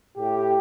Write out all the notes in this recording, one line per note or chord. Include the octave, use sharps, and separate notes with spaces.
A2 G4